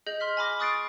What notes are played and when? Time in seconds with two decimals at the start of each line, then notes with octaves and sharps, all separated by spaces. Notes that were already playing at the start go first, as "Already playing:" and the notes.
0.06 G#4 D#5 G6 F#7
0.20 C6 F6 B6
0.37 G#5 B5 D6 A#6
0.59 C#6 D#6 F#6 A6 C7 D7